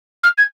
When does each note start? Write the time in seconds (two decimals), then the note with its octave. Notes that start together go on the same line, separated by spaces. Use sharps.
0.23 F6
0.38 G#6